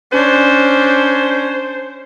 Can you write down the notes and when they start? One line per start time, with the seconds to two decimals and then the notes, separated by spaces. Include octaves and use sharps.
0.12 C#4 D4 C5